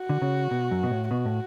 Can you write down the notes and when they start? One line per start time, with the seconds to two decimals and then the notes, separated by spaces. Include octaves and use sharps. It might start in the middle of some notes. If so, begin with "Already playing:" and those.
Already playing: F#4
0.09 D3
0.22 C#3
0.51 B2
0.71 F#2
0.83 B2
0.91 A2
1.11 B2 F#4
1.25 A2